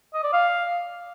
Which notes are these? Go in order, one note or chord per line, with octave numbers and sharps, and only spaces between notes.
D#5
D5
F5